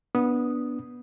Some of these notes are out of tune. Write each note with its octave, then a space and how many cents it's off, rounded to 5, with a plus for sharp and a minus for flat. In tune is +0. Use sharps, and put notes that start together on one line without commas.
B3 -15 D4 -10 D#6 +0